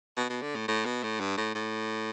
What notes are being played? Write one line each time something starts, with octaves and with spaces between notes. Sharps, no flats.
B2
B2
D3
A2
A2
B2
A2
G2
A2
A2